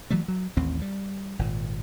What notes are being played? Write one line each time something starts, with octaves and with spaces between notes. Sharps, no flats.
E3 F#3 G3 A3
F#3
A1 D#2 C4
G3
G#1 A#2